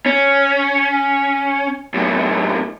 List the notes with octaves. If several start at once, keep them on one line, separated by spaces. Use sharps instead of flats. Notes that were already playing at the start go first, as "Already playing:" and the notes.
C#4
F#2 A2